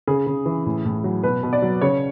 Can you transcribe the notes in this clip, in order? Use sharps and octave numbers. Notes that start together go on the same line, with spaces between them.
C#3 G#4
C#3
E3
A2
A2
F#3
B2 B4
B2
D5
F#3
C#3 C#5